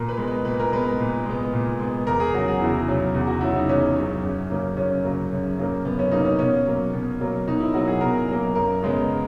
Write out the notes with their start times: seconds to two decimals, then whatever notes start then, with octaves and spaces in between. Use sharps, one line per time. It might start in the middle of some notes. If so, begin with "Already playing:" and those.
Already playing: A#2 A#4
0.09 B4
0.17 G#3 B3
0.28 B4
0.45 A#2 B4
0.59 A#4
0.72 G#3 B3 B4
0.99 A#2
1.26 G#3 B3
1.53 A#2
1.80 G#3 B3
2.07 E2 A#4
2.20 G#4
2.34 C#3 F#3 F#4
2.48 G#4
2.61 E2 E4
2.88 C#3 F#3
3.15 E2
3.27 F#4
3.41 C#3 F#3 E4
3.55 D#4
3.69 E2 C#4
3.96 C#3 F#3
4.23 F#2
4.50 C#3 F#3 A#3
4.77 F#2 C#4
5.03 C#3 F#3 A#3
5.31 F#2
5.59 C#3 F#3 A#3
5.85 F#2 B3
5.99 C#4
6.11 C#3 F#3 A#3 D#4
6.25 C#4
6.39 B2 C#4
6.66 F#3 A#3
6.93 B2
7.21 F#3 A#3
7.46 B2 D#4
7.60 E4
7.74 F#3 A#3 F#4
7.88 G#4
8.01 B2 A#4
8.28 F#3 A#3
8.55 F#2 A#4
8.83 C#3 G#3 B3